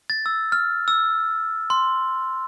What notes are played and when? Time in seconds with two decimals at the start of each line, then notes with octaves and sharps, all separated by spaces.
0.10 A6
0.26 E6
0.52 F6
0.88 E6
1.70 C6